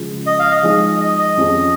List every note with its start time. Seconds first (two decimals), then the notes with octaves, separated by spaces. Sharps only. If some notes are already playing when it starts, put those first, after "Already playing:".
Already playing: C#3 F3 G#3 F4 G#4
0.26 D#5
0.39 F5
0.52 D#5
0.63 F3 G#3 D#4 G#4
1.01 D#5
1.18 D#5
1.37 F2 F3 C#4 G#4